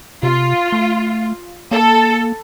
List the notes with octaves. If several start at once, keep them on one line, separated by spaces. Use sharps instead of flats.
C3 F4
A3
A#3 A4